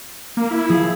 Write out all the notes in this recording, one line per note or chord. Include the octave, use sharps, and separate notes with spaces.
A#3
E4
F3 G#4